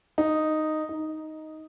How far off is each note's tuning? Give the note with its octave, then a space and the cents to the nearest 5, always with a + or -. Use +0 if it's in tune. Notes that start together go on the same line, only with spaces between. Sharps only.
D#4 -5
D#4 +5